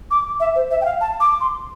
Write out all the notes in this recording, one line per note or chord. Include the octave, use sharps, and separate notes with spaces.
D6
E5
C5
E5
G5
F5
A5
D6
C6